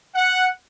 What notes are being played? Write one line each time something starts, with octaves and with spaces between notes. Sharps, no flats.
F#5